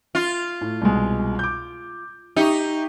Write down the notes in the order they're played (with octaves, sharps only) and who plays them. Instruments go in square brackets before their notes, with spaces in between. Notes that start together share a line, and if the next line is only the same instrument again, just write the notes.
[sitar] F4
[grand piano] A2
C2 B2 G#3
D6 G6
[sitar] D#4 [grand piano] G4 E5 C#6